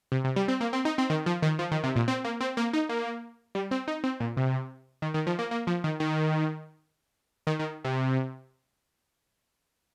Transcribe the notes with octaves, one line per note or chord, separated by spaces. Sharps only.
C3
C3
G3
C4
A#3
C4
D#4
C4
D#3
F3
D#3
F3
D#3
C3
A#2
C4
A#3
C4
A#3
D#4
A#3
G3
C4
D#4
C4
A#2
C3
D#3
D#3
F3
A#3
A#3
F3
D#3
D#3
D#3
D#3
C3